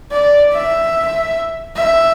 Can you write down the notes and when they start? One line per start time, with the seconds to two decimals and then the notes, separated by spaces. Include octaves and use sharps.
0.12 D5
0.53 E5
1.76 E5